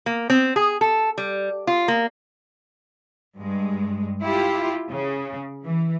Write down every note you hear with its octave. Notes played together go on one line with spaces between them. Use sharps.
A#3
C4
G#4
A4
G3
F4
A#3
G2 G#3
E4 F4 G4
C#3
E3